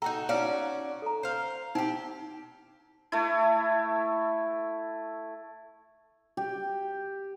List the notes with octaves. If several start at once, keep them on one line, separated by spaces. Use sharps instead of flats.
D#4 F#4 A4 G5 A#5
C#4 D#4 F#4 D5 F5
A4 A#5
C5 F5
C4 D#4 G4 G5
A3 E4
G4